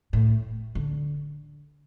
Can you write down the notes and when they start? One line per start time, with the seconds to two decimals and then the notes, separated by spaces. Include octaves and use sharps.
0.13 A2
0.75 D3